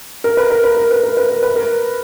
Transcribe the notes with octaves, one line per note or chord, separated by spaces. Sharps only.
A#4
B4
A#4
B4
A#4
B4
A#4
B4
A#4
B4
A#4